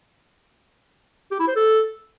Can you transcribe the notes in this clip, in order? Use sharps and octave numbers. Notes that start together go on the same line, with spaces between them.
G4
E4
C5
A4